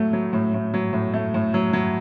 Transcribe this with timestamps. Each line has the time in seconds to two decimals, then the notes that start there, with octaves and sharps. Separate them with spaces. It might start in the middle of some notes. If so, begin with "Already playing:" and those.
Already playing: A2 F#3 A3
0.13 F#3
0.33 A2
0.54 A2
0.74 F#3
0.93 A2
1.14 A3
1.34 A2
1.54 F#3
1.73 F#3